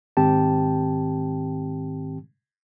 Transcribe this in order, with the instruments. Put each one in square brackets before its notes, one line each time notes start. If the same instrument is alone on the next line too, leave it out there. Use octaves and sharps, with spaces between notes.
[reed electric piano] G#2 D#3 C4 G4 G5 A5